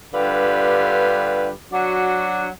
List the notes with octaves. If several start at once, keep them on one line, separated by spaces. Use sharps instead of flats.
G2 D3 F4 G4 B4
F#3 D4 F#4